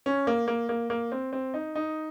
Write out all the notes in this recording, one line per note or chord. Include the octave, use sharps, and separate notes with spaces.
C#4
A#3
A#3
A#3
A#3
C4
C4
D#4
D#4